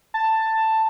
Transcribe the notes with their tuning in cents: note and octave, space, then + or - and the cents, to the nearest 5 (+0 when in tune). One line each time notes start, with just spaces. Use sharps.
A5 +10